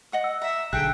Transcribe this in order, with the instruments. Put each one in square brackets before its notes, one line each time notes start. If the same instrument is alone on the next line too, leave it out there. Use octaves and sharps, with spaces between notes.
[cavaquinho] D#5 F#5 D#6
[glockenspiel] E6
[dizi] E5 [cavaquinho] A#5
[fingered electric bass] B1 D3 [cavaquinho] G#4 A4 [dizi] G5 [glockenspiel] F#6